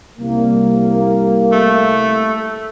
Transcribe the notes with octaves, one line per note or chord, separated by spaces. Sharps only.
C2 A#3
A3